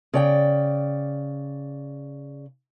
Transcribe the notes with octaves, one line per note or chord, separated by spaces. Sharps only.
C#3 D5 G5